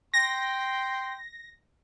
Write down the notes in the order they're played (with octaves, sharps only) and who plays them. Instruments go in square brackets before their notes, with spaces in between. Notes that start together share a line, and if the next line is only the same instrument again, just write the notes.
[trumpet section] G5 C6 [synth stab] A#6